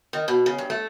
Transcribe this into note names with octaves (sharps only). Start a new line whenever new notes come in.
D#3
B2
C#3
G2
A3